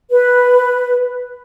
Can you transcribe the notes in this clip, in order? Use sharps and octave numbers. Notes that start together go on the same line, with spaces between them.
B4